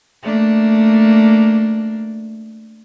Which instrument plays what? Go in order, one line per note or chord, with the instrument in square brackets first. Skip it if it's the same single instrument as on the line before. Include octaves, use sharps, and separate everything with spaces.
[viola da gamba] A3 A#3 D4